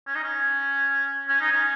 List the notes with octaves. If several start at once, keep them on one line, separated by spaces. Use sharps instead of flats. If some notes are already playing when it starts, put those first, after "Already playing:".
C#4
D#4
C#4
C#4
D#4
C#4